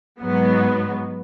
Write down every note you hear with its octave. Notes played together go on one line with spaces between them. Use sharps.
G#2 F#3 B3